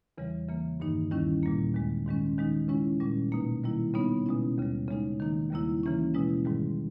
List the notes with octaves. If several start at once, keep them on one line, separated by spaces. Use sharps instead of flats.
E2 C#3 E3 G3
C#3 E3 A#3
G2 D#3 A#3 D#4
D#2 D#3 G3 C#4 E4
A#2 G3 A#3
D#2 D#3 G#3
G#2 D#3 G#3 C#4
D#3 G#3 D#4
C#3 G#3 C#4 E4
A#2 G3 C#4
B2 A#3 D#4
D#3 G3 A#3 E4
C#3 G3 B3 D#4
B2 G#3 C#4 E4
D#2 C#3 G3
C#3 G#3 D#4
D#3 A#3 D#4
D#2 C#3 G3 A#3 E4
C#3 E3 A#3 C#4 E4
B2 G#3 C#4 E4
G#2 D#3 G3